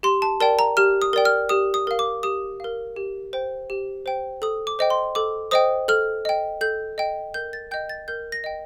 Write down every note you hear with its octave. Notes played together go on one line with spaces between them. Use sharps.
G4 C6
A5
A#4 D5 G5 A5
A#5
G4 F6
D#6
A#4 D5 G5
F6
G4 D#6
D#6
A#4 F5
D6
G4 D#6
A#4 F5
G4
C5 G5
G4
C5 G5
A4 D#6
D6
C5 D#5 G5
C6
A4 D6
C5 D#5 G5 D#6
A4 F6
D#5 G5
A4 G6
D#5 G5
A#4 G6
A6
D#5 G5 G6
A6
A#4 G6
A#6
D#5 G5